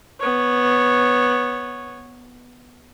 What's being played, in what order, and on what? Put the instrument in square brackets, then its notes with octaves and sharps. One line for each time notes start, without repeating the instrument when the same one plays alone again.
[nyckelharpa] B3 C#5